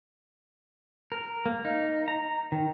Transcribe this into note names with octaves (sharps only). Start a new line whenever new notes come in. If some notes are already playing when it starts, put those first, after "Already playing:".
A#4
A#3
D#4
A#5
D#3